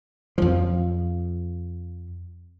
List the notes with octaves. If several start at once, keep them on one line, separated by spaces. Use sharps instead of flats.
F2 F3